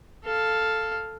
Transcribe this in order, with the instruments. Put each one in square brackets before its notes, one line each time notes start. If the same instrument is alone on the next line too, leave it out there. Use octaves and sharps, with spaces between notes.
[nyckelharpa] A4 F5